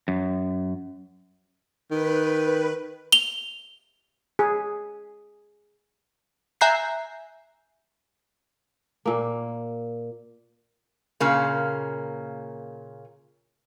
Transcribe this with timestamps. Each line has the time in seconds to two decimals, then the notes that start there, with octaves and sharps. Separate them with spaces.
0.08 F#2
1.91 D#3 B4
3.12 F7 G7
4.39 G#4
6.61 E5 G#5 A#5 F#6 G6 C7
9.06 A#2 A#3
11.20 A#2 C#3 A#3